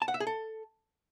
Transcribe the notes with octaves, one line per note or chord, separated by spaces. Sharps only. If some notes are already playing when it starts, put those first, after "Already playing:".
A5
F#5
E5
G#4
A4